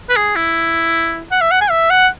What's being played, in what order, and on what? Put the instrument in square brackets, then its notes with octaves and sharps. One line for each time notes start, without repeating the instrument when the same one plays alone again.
[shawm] B4
G#4
E4
F#5
E5
F#5
G#5
E5
F#5